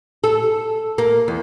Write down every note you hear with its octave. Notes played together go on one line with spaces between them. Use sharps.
A4
A#3
E2